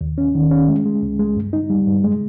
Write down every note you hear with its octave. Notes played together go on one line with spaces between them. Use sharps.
D#2
C#4
D#3
C#4
G#3
G#3
C#2
G#3
G2
D#4
G3
G2
G#3